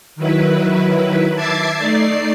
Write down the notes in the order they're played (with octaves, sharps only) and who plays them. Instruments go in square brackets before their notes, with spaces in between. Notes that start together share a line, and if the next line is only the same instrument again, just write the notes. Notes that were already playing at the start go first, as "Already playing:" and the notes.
[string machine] D#3 F#3 E4 B4
E5 A5 D6 G#6 A6 C7
A3 D#4 D5 C7